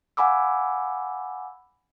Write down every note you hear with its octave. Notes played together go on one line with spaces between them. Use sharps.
F5 F#5 G#5 B5 D6 E6